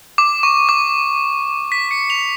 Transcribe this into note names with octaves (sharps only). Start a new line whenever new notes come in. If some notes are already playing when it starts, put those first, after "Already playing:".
D6
C#6
D6
B6
C#7
F7